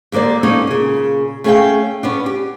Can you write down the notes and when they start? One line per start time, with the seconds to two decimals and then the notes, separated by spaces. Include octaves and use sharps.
0.12 D#2 D3 A#3 C5 D5
0.43 A#3 B3 C#4 D#4 A4
0.67 A#2 C#3
1.44 A3 C#4 G#4 D5 F5 G5
2.03 B3 C#4 D4
2.26 G4